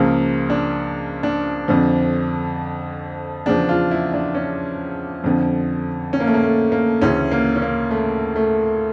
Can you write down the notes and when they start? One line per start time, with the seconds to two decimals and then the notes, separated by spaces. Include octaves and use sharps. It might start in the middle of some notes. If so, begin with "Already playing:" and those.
Already playing: C#2 C#3 F3 A#3
0.50 D4
1.23 D4
1.68 F2 D3 F3
3.46 E2 C#3 F3 D4
3.69 F4
3.91 E4
4.13 D4
4.35 C#4
5.24 F2 D3 F3
6.13 C#4
6.20 A#3
6.27 A3
6.34 A#3
6.43 A3
6.72 A#3
7.01 D2 C#3 E3 C#4
7.31 A#3
7.56 C#4
7.62 A#3
7.91 A3
8.36 A3